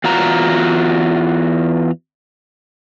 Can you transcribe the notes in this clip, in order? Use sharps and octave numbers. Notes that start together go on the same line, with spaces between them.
E2 F4 F#4 A#5